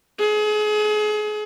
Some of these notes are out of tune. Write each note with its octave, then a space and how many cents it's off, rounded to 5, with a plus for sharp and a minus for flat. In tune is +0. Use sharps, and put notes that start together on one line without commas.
G#4 +35